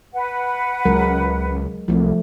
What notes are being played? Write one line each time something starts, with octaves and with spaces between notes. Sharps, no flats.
B4 F#5
C#2 F#3 G#3 A#4
C2 F3 A3